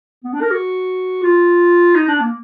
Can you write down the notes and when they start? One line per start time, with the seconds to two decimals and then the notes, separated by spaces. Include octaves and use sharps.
0.24 B3
0.33 D4
0.41 A#4
0.51 F#4
1.23 F4
1.95 D#4
2.08 D4
2.20 A#3